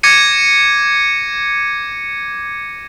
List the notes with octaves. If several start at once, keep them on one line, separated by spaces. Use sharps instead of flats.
D6 G#6 A#6 C#7 D#7